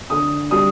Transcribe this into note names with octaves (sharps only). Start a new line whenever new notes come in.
D3 D#6
G3 D#6